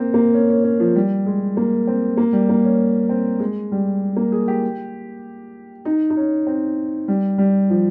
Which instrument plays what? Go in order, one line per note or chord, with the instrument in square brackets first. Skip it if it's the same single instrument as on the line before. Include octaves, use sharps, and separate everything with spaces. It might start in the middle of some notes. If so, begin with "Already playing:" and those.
Already playing: [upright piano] A#3 C4
A#3
C#4
C#4
C#4
F3
G3
G#3
A#3
C4
A#3
G3
A#3
C#4
C4
G#3
G3
A#3
G#4
G4
D#4
D#4
C#4
C4
G3
G3
F3